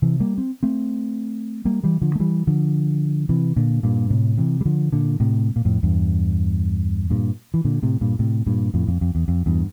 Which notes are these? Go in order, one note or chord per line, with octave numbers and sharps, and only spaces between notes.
C3 E3
G3 A#3
C4
A3 C4
G3 A#3
E3 G3
D3 F3
A3
E3 G3
D3 F3
C3 E3
A#2 D3
G2 A#2
A2 C3
C3 E3
G3
D3 F3
A#2 D3
A2 C3
A#2
F2 A2
E2 G2
G2 A#2
E3
A#2 D3
A2 C3
G2 A#2
A2 C3
G2 A#2
F2 A2
F2
F2
E2
F2
E2 G2